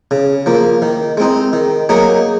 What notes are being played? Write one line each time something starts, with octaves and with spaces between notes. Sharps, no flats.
C#3
F3 A#3
D#3
G#3 C4 D#4
D#3
F#3 A#3 D#4 G#4